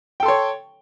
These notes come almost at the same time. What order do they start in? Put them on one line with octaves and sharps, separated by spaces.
G5 A4 C6 C#5